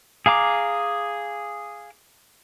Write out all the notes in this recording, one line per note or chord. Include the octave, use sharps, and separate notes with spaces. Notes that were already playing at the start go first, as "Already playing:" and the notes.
G#4 F5 A#5 D6